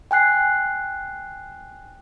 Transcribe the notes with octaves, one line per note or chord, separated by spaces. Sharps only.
G5 G#5 F#6 C7